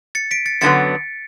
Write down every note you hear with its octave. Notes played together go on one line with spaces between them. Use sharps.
A6 C#7
B6 D7
A6 C#7
F#2 D3 F#3 B3 A6 C#7